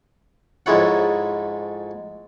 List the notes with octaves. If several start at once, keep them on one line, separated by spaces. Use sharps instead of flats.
F2 G#2 G#3 E4 C#5 F#5